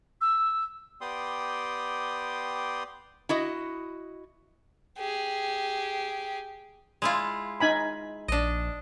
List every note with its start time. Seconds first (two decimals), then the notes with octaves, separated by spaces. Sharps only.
0.21 E6
1.01 B3 G4 D5 G5 C6 D#6
3.29 E4 F#4 D#5
4.98 G4 G#4
7.02 G#3 E4 F4
7.60 D#4 G#5 B5
8.28 A#1 D4 D#5